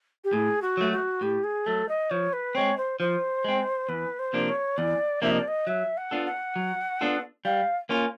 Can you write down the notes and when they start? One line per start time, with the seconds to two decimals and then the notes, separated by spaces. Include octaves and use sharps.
0.24 G4
0.33 A2 G#4
0.62 F#4
0.77 F#3 A3
0.92 F#4
1.21 A2 G4
1.44 G#4
1.66 F#3 A3 A4
1.89 D#5
2.11 F3 C#5
2.33 B4
2.55 G#3 C4 C#5
2.77 C5
3.00 F3 C5
3.44 G#3 C4
3.89 E2 B4
4.19 C5
4.33 C3 F3 A#3 D4
4.48 C#5
4.78 E2 D5
5.22 C3 F3 A#3 D4 E5
5.31 D#5
5.39 D5
5.48 D#5
5.67 F#3 E5
5.97 F#5
6.11 B3 D4 F4 A4
6.26 F#5
6.56 F#3
7.01 B3 D4 F4 A4
7.45 G3 F5
7.89 A#3 C#4 F4